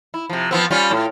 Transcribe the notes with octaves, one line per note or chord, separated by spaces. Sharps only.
E4
C3 F3
F3 B3 C4
G3 C#4 F4
A2